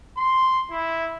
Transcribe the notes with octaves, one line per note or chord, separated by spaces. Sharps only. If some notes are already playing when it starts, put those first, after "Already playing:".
C6
E4